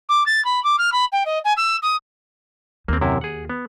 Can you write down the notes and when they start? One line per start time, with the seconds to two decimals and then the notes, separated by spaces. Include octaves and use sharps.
0.09 D6
0.26 A6
0.45 B5
0.64 D6
0.78 F6
0.92 B5
1.12 G5
1.26 D#5
1.45 G#5
1.57 E6
1.82 D#6
2.88 D#2 A#3 C4
3.01 F#2 C3 E4
3.21 G#4 F#5
3.50 B3